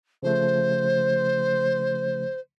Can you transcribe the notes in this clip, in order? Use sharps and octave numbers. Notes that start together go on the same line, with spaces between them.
C#3 F3 A3 C5